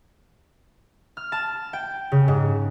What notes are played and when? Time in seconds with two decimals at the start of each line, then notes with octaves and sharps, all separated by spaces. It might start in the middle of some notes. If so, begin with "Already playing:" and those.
1.17 F6
1.32 A5
1.73 G5
2.12 C#3
2.28 G#2